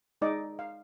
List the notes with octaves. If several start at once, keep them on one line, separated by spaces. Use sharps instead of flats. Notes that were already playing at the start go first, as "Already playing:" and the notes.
G#3 D#4 D5 D#5
F5